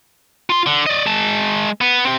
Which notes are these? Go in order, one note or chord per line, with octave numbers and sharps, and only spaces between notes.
F4 C6
D3
D5 D#5
G#3 A5
B3
C4 G4